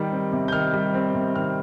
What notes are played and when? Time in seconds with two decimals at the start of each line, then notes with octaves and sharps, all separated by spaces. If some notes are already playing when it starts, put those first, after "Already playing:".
Already playing: D#3 G3
0.12 C4
0.33 C3
0.48 G6
0.52 D#3 F6
0.74 G3
0.94 C4
1.15 C3
1.36 D#3 F6